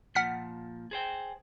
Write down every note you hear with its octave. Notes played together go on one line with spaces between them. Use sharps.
A#2 F3 F#5 F6 B6
G#4 C5 G5